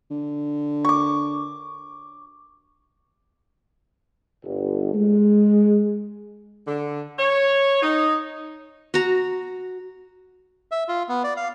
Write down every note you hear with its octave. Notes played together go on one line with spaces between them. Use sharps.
D3
C#6 D6
G1
G#3
D3
C#5
D#4
F#4 A#5
E5
F4
B3
D5
F5